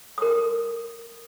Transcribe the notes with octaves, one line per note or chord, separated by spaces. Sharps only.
A#4 D#6